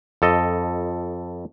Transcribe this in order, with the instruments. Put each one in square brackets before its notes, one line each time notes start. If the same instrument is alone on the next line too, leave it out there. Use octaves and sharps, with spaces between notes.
[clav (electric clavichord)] F2 A4 D#5